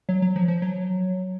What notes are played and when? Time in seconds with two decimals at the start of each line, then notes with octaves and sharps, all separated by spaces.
0.09 F#3
0.22 F#3
0.36 F3
0.48 F3
0.62 F#3